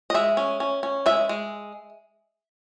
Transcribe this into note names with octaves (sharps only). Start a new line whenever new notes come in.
D#5
G#3 E5
C#4
C#4
C#4
G#3 E5
G#3